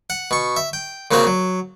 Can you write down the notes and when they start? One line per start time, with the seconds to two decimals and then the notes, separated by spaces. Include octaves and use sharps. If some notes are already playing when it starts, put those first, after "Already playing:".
0.10 F#5
0.31 B2 C#6
0.57 E5
0.73 G5
1.11 A#2 C#3 A#3 C4 F#4
1.27 F#3